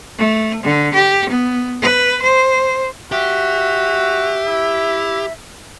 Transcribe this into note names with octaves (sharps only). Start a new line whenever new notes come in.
A3
D3
G4
B3
B4
C5
F#4 G4 E5
E4